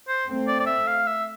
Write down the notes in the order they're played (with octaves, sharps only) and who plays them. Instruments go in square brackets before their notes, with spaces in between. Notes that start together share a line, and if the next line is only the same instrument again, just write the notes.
[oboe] C5
[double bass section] A3 C4
[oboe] D5
D5
E5
F5
E5